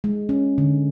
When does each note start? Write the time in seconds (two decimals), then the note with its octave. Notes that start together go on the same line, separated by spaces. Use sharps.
0.04 G#3
0.29 C#4
0.58 D3